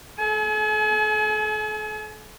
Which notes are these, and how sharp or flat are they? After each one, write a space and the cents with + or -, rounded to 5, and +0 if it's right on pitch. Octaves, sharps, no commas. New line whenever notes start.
A4 -40 G#5 +40